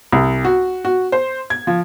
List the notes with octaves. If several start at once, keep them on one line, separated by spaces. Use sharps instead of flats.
C2
F#4
F#4
C5
G#6
F3